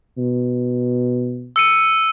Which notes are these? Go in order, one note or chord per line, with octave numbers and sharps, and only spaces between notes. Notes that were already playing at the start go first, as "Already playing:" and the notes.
B2
E6 C#7 D#7